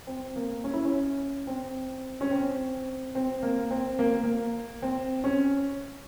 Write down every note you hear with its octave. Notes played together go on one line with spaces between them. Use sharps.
C4
A#3
C#4
E4
C#4
C4
C#4
C4
C4
A#3
C4
A#3
A#3
C4
C#4